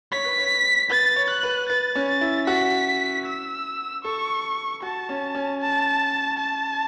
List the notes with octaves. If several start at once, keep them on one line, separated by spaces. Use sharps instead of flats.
C#5 B6
B4
C#5
B4 A6
C#5
F#6
B4
B4 A6
C#4
A6
E4
F#4 B6
E6
A4 C#6
F#4 A5
C#4
C#4
A5
A5